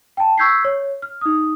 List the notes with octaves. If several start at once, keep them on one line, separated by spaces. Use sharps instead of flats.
G5 A5
C#6 E6 G6 G#6 B6 C7
C#5
F6
D#4 D#6